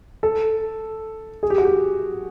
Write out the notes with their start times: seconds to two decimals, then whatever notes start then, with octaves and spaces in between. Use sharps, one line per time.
0.23 A4
1.43 G#4
1.50 G4
1.58 F#4
1.65 G4